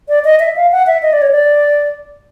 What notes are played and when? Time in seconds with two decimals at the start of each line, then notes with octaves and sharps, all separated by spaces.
0.09 D5
0.24 D#5
0.40 E5
0.56 F5
0.72 F#5
0.87 E5
1.02 D#5
1.13 D5
1.22 C#5
1.31 D5